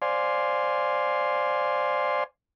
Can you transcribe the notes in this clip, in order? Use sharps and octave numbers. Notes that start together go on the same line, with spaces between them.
C5 D5 F5 G#5 C6